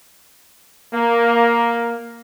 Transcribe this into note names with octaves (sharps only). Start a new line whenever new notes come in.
A#3